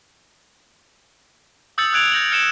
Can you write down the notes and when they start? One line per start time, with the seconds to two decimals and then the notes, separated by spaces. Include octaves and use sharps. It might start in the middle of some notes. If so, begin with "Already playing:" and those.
1.78 D#6 E6 G6 A6 C#7 F#7
1.93 E6 F#6 G#6 D7 F7
2.12 G6 A#6 F#7
2.31 F6 A6 C#7 D7 E7